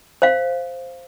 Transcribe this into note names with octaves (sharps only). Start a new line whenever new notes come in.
C5 F5